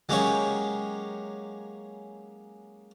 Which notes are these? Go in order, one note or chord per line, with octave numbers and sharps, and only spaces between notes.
F#3 G#3 A#3 C#4 G4 C#5